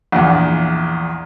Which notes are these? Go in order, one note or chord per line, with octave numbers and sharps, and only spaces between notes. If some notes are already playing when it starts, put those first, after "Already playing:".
A#1 E2